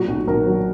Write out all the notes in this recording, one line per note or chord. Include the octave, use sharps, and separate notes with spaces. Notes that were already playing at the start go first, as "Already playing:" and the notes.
Already playing: A#2 F#3 F#4
B1
B1 A#4
F#3